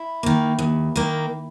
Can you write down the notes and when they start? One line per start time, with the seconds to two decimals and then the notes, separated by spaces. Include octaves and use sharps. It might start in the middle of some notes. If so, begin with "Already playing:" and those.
Already playing: E4
0.23 D#3 A#3
0.59 D#2
0.96 D#3 A#3